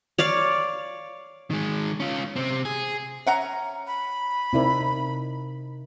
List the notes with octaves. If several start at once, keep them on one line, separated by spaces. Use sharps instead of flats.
C#5 D5 F5
D#3 G#3
C#4 F4
C3 C4
G#4
C#4 E5 F#5 A#5
B5
C3 C4 D#4 E4 A#4 D5